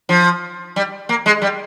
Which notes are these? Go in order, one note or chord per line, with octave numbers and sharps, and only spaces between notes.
F3
G3
A#3
G#3
G3